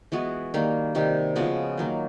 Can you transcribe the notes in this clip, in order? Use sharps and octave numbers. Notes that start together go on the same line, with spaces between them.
E3 G#3 B3 F#4
D#3 G3 A#3
C3 D#3 G3
C#3 F3 G#3 B3 F#4
D#3 F#3 A#3